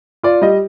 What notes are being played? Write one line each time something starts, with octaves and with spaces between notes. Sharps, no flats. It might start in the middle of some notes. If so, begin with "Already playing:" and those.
F4 D5
G3 D#5